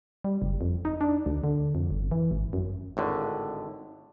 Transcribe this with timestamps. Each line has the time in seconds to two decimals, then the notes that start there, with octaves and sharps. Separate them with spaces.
0.24 G3
0.42 F#1
0.61 F2
0.85 D#4
1.01 D4
1.26 D2
1.44 D3
1.75 F2
1.90 G1
2.11 E3
2.31 G#1
2.53 F#2
2.97 G#1 A2 D3